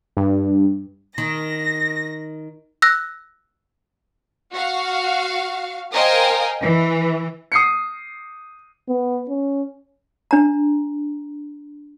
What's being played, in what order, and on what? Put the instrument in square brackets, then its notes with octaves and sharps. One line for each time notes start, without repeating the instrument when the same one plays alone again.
[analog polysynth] G2
[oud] D#3 [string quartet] A#6
[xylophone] E6 F#6 A#6
[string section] F#4 F5
A#4 C5 D#5 F5 G5 G#5
E3
[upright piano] D#6 C7 C#7
[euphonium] B3
C#4
[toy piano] D4 A#5